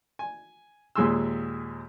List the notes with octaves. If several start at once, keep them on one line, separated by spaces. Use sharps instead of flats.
G#5
D#2 A#2 G#3 G#5 C6 E6